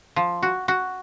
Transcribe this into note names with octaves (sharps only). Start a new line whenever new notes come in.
F3
F#4
F#4